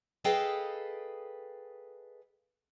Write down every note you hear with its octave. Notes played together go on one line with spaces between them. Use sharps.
G#4 A4 B4 D#5 F5 G5